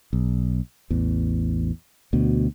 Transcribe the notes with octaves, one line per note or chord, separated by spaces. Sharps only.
B1
A1 E2
D2 B2